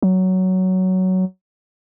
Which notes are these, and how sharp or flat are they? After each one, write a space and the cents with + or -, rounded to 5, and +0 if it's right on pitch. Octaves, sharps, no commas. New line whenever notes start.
F#3 +10